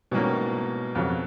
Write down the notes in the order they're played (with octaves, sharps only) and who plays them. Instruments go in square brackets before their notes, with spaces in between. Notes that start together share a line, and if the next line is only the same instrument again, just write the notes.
[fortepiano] G#2 E3 G3 A#3 C#4 [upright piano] B2
[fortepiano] F2 C#3 F#3